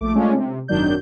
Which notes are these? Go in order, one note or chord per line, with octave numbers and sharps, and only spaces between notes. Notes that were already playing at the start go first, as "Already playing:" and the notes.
A#1 A3 D6
G#3 A3 C#4 D4 F4
C3
G#1 F#2 D#3 F#3 D4 G6